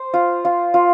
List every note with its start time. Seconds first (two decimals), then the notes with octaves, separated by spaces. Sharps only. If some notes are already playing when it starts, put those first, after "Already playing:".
Already playing: C5
0.14 F4
0.45 F4
0.74 F4